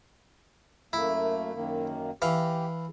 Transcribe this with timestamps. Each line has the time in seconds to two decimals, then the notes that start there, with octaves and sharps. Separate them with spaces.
0.93 F#2 A3 A#3 E4
1.53 F#2 D#3 A#3
2.22 E3 G4 F5